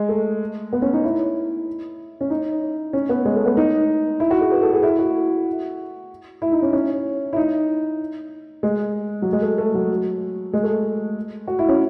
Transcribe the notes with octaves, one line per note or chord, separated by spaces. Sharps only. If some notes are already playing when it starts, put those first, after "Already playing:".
Already playing: G#3
A3
B3
C#4
D#4
E4
C#4
D#4
C#4
B3
G#3
A3
B3
D#4
E4
F#4
G#4
B4
A4
G#4
E4
F#4
E4
D#4
C#4
C#4
E4
D#4
G#3
F#3
G#3
A3
A3
F#3
G#3
A3
F#4
E4
C#4